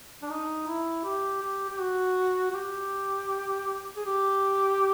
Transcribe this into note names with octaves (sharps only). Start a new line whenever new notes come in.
D4
D#4
E4
G4
G4
G4
F#4
F#4
G4
G#4
G4